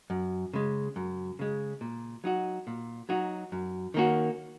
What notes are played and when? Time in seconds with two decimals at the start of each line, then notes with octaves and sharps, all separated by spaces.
0.10 F#2
0.53 C#3 G#3
0.96 F#2
1.39 C#3 G#3
1.81 A#2
2.24 F#3 D#4 F#4
2.67 A#2
3.09 F#3 D#4 F#4
3.52 F#2
3.94 D#3 A#3 C#4 F#4